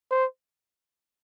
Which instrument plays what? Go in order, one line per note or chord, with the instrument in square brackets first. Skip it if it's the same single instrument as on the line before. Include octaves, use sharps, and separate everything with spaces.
[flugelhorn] C5